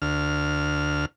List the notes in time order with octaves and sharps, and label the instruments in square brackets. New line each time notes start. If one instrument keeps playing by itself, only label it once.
[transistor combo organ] D2 F6